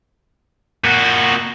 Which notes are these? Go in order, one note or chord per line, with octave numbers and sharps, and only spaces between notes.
A#2 F#4